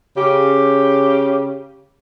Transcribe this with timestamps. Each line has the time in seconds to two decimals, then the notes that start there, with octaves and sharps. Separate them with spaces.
0.17 C#3 G4